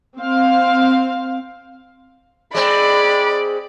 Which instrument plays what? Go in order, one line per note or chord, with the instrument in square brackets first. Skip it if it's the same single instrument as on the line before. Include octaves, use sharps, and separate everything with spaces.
[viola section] C4 F5
[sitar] G#3 C4 [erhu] D5 [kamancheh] B5